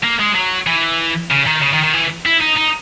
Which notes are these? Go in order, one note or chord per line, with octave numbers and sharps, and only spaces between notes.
A#3
G#3
F#3
E3
C#3
D#3
C#3
D#3
D#3
E3
E4
D#4
D#4